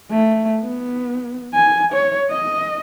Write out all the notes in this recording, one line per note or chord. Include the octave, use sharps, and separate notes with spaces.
A3
B3
G#5
C#5
D#5